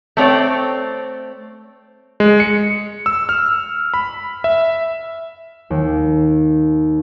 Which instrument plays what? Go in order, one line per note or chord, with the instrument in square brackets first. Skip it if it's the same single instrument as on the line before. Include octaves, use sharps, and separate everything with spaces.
[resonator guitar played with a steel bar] A3 C4 C#5 D5
[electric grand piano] G#3
C#7
E6
F6
B5
E5
[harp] D#2